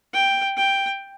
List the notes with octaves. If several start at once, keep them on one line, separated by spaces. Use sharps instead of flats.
G5
G5